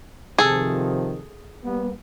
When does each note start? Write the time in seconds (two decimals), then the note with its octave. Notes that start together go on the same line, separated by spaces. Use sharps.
0.38 C3 D#3 F3 G#4 A4
1.64 G3 A#3 B3